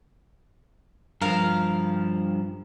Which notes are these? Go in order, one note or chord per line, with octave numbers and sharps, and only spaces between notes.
G2 F3 A#4 F5